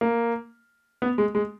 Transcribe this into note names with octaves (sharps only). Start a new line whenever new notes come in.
A#3
B3
G#3
G#3